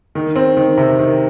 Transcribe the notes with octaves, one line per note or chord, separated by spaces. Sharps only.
D#3
C4
D#3
C3
D#3